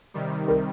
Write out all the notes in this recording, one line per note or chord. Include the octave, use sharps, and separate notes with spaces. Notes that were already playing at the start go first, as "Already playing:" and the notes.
C3 D#3 G3
A#4